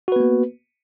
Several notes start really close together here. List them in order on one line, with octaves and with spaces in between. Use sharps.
F#4 B4 B3 A#3